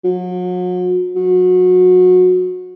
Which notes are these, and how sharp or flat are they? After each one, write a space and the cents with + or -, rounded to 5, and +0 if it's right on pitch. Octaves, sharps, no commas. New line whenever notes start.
F#3 -40
F#3 -25